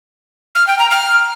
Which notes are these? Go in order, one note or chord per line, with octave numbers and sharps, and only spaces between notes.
F6
G5
A#5
F6